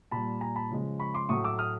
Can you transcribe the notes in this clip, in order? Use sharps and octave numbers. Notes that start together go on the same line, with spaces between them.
A#2 G3 A5 B5
G#5 A#5
A5 B5
C#3 F3 G#3
B5 C#6
C6 D6
A2 F#3 A3 C#6 D#6
D6 E6
D#6 F6